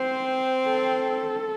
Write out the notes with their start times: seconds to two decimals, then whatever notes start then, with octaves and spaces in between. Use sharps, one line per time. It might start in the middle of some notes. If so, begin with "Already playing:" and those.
Already playing: C4 C5
0.67 A4